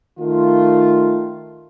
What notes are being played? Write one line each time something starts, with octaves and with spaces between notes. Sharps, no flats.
D#3 A3 F4